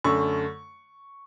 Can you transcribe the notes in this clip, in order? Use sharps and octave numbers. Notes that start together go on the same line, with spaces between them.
F#2 D3 A3 C#6